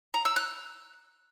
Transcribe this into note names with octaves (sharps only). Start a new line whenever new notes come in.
A#5
E6
F#6